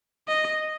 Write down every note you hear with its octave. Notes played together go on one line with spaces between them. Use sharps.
D#5